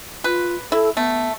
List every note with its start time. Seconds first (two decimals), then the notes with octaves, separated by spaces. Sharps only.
0.24 F4 B4
0.72 E4 A4
0.97 A3 B3